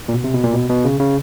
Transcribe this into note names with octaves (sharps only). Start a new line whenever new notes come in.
A#2
B2
C3
B2
A#2
B2
B2
C#3
C#3